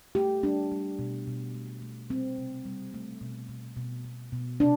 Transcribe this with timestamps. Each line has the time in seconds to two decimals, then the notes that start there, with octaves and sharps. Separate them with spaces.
0.15 A3 G4
0.43 G3 D4
0.72 G3
0.99 B2
1.27 B2
1.54 A3
1.82 A3
2.10 G3 C4
2.38 C3
2.66 G3
2.94 A3
3.21 B2
3.49 B2
3.77 B2
4.05 B2
4.32 B2
4.60 C3 D4